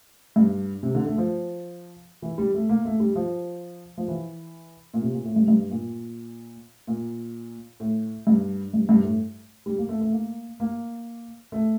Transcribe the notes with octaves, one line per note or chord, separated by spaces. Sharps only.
G2
C3
D3
A3
F3
E3
G3
A3
A#3
A3
G3
F3
F3
E3
A#2
C3
A#2
A2
G2
G2
A#2
A#2
A2
G2
G2
G2
A2
G3
A#3
A3
A3
A#3
A#3
A3